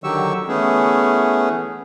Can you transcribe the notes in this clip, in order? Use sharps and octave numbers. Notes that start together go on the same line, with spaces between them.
D3 D#3 F#3 G4 C#6 E6
E3 A3 B3 C#4 G#4